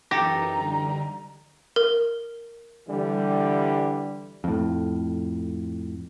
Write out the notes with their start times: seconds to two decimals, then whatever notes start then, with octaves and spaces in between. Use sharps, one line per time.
0.11 F#2 E3 D#4 G4 A4 A#5 A#6
0.55 D3 G3
1.76 A#4
2.89 D3 E3 G3
4.44 F2 A2